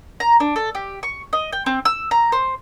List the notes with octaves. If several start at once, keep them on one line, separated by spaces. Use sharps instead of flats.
A#5
D4
A4
G4
C#6
D#5
G5
C4
E6
A#5
C5